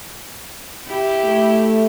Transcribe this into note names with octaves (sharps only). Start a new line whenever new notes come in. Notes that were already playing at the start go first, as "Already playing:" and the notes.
E4 G4
A3